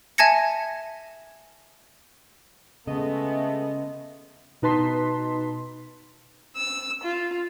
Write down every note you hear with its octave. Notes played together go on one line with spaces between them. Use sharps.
E5 G#5 A5 G#6 A#6 C#7
C#3 G#3 A3 B3 D#5
B2 D#4 B4 A5 C6 B6
E6
F4